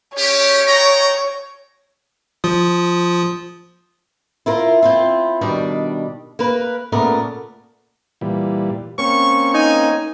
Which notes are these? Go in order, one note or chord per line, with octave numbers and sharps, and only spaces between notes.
C#4 G4 C#5
D#5 G5 A#5
F3 F4 D#6
E4 F4 A#4
C4 E4 F4
B2 D#3 G3 D4 D5
A#3 A#4 B4
A#2 C#3 A3 B3 A#4 D5
A#2 E3 G3
A#3 C4 C#4 C#6
D#4 G#5